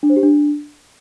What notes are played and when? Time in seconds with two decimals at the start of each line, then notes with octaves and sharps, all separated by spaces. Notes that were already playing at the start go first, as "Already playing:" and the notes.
0.03 D4
0.10 C5
0.16 G4
0.23 D4